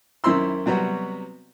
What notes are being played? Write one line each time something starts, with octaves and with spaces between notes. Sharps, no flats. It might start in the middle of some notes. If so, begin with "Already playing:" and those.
F#2 D#3 E4 C5 C6 E6
C3 F#3 G3 B3 F#4